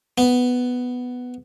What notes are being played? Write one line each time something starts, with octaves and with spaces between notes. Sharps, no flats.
B3